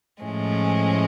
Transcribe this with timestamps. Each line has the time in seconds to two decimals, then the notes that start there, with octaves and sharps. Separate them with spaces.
0.21 A2 F3 G#3 C#4